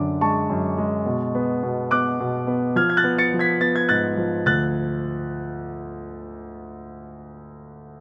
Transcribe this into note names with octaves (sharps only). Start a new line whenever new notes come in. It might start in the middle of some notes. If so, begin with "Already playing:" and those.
Already playing: F#2 D3 D4 D6
G#3 A5 C#6
F#2
G#3
B2
B3
B2
B3 D6 F#6
B2
B3
F3 F6 G#6
G#6
F#6 A6
B3
A6 C#7
F3
G#6 B6
B3 A6
G#6
G#2 F#6 A6
F3
D2 F#6 A6